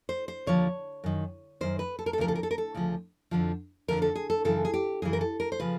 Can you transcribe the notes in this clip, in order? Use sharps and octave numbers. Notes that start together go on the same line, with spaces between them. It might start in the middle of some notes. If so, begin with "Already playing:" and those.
C5
C5
D#2 D3 F3 C#5
F#2 D#3
F#2 D#3 C5
B4
A4
A#4
A4
D2 C#3 F3 A#4
A4
A#4
A4
A#4
A4
D2 C#3 F3
F2 D3 F3
F2 D3 F3 A#4
A4
G#4
A4
F#2 C#3 E3 A4
G#4
G4
F#2 C#3 E3 G#4
A#4
A4
A#4
C5
C#3 F3 B4